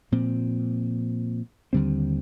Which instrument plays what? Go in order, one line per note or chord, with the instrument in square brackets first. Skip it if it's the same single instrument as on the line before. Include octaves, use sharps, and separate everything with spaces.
[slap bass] A#2 F3 C4
D#2 D3 G3 C4